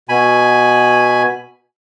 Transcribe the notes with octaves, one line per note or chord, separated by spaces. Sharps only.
B2 G#5 B5